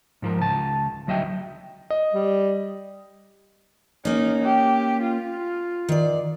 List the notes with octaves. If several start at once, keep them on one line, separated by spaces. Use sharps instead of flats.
G#2 F3 A#4
C#2 A5
D2 F#3 D#5 E5 G5
D#5
G3
A#3 C#4 D#4
G4
F4
D#3 D5